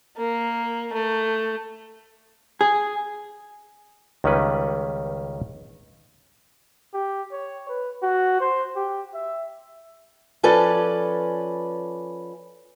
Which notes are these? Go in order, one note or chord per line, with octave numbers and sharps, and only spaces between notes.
A#3
A3
G#4
C#2 D#3 G3 C#4 B4
G4
C#5
B4
F#4
C5
G4
E5
F3 C#4 A4 B4 D5